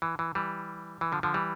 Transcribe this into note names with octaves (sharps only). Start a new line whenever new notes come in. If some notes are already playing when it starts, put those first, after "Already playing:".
E3
E3
E3 G3
E3
D3 F3
D3 F3
E3 G3